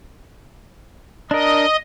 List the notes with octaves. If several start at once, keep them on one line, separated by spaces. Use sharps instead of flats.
D4 A#4 D#5